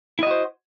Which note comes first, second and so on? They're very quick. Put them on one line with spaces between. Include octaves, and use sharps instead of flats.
E4 D#5 F#4 C5